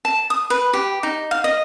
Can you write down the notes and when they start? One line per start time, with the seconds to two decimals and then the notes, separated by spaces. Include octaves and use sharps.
0.05 A5
0.30 D#6
0.50 B4
0.73 G4
1.03 D#4
1.31 F5
1.44 D#5